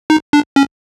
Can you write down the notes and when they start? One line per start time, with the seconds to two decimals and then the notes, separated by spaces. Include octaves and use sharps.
0.10 D#4
0.33 D4
0.56 C#4